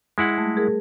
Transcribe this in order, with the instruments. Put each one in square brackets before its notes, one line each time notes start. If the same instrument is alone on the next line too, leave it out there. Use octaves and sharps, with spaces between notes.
[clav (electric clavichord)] G#3 E4 F#5
[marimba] G3 A3
G#4 A#4